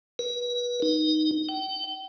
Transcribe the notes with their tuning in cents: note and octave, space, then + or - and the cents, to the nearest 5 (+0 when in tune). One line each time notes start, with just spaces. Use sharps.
B4 -30
D#4 -5
G5 -35